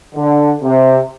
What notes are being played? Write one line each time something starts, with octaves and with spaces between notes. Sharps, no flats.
D3
C3